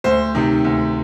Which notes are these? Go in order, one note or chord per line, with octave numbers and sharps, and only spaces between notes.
D2 C5
C3 D#3
D2